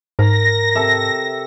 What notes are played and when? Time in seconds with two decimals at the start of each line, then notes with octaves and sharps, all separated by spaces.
0.19 G#2 A#4 A#6
0.75 C3 A4 E5